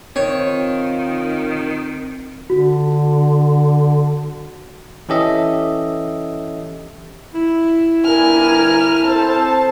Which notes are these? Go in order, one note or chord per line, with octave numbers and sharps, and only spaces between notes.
D#3 C4 F4 C#5
D3 F#4
E3 C#4 G4 A4 D#5 E5
E4
G1 G2 A#4 G#5 F6
C4 A4 C5 A5